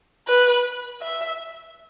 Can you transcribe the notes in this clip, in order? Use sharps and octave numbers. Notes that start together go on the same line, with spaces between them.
B4
E5